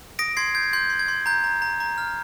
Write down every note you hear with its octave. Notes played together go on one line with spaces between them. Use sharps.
D#6 A#6 D7
C6 G#6 C7
G6 G#6
C6 G6
C6
G#6
C6
A#5 G6
A#5
A#5
A#5
F6